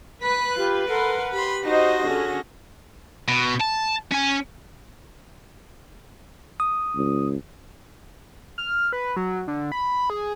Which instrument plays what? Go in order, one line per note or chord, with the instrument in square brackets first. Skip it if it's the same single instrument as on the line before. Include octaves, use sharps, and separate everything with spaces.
[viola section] B4 [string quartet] B5 F#6
[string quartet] F4 [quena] G4
[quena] A4 [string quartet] A#4 F#5 C6
[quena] G4 [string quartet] B5 C6
[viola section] D#4 C5 D#5 [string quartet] F#4 A#6
[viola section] D3 C#4 G#4
[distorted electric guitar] B2
A5
C#4 G#5
[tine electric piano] D#6
[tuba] C#2
[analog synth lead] F6
B4
F#3
D3
B5
G#4